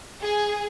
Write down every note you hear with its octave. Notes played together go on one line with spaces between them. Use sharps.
G#4